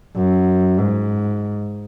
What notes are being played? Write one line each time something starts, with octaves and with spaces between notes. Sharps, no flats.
F#2
G#2